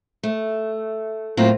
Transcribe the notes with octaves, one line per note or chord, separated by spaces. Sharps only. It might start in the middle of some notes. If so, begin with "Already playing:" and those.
A3
A2 F#3 A#3 C4 F4